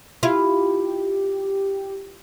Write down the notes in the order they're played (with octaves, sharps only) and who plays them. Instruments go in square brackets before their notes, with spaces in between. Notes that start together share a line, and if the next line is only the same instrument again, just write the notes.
[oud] E4 F4 [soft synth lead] G4